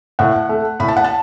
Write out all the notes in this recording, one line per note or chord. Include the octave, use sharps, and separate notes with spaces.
A2 F#5
A3
A2 B5
A5
F#5
A5